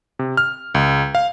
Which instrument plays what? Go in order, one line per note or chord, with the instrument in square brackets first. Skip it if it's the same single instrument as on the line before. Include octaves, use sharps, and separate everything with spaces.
[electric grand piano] C3
F6
C#2
F5